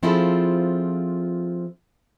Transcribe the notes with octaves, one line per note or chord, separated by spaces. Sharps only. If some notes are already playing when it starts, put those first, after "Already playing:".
F3 C4 E4 F4 G#4 A4